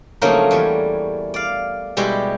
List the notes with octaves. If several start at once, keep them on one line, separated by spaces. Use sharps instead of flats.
C#3 F3 F#3 A3 A#3 D#4
E2 G3 C#5
D5 F5
B2 G3 G#3 E4 G4